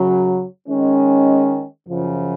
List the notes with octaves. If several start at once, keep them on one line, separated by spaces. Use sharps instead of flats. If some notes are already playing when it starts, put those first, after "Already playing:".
Already playing: F#2 C#3 F#3
D#3 G#3 C#4
F#2 C#3 F3